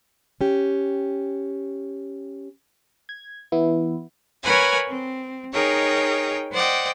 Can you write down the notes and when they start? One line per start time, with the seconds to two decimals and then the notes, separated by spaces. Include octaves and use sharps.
0.41 C#4 G4
3.09 G#6
3.52 E3 B3 E4
4.43 A#4 B4 C#5 F#5 G#5 B5
4.88 C4
5.52 D#4 G#4 A#4 C#5 G5
6.52 C5 D5 D#5 F#5 G5